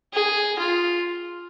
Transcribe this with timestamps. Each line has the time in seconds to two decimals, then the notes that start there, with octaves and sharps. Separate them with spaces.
0.13 G#4
0.59 F4